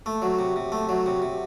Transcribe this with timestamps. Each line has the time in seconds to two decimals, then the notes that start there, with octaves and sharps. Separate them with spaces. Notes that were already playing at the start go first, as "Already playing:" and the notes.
0.06 A3
0.22 F#3
0.39 C3
0.56 C3
0.72 A3
0.89 F#3
1.06 C3
1.22 C3